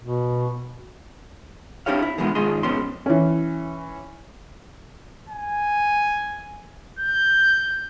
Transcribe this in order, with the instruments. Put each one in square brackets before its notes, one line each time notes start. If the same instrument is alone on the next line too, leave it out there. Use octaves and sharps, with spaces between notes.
[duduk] B2
[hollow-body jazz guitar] C4 D4 E4 G4 C#5 F5
E4
B2 D3 E3 F3 G#3 B3
G#2 D#3 F3 D#4 G#4 C6
F2 G#2 B2 C#4 C6
[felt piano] E3 C#4
[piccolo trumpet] G#5
G6